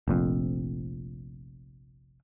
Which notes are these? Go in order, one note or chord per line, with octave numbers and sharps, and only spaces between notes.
F1 A#1 F2